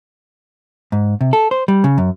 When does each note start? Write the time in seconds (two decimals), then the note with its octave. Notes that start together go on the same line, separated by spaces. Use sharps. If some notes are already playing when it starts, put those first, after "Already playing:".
0.92 G#2
1.21 C3
1.33 A4
1.51 C5
1.68 G3
1.84 C#3
1.98 F#2